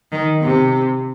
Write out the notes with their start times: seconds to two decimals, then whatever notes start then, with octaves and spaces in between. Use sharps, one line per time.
0.12 D#3
0.42 C3